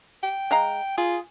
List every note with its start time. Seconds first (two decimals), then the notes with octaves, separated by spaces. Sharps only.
0.23 G5
0.51 G#3 F5 A#5
0.98 F4 G#4